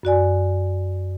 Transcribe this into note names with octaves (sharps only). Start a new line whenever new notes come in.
F#2 F#4 D5 G#5